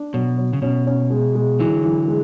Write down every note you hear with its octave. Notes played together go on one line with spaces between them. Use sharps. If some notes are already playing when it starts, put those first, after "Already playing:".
Already playing: D4
B2 F#3
F#3
C#3
B2 C#4
C#4
G#3
G#3
D3 E3 F#3
E3
G#3